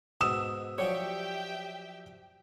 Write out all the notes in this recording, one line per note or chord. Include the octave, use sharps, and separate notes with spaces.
G#2 B2 D#6 E6 E7
F3 F#3 D4 G4 C#5 E5 G5